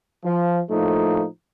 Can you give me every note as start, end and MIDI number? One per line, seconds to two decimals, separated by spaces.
0.23 0.60 53
0.69 1.25 45
0.69 1.25 53
0.69 1.25 57
0.69 1.25 58
0.69 1.25 63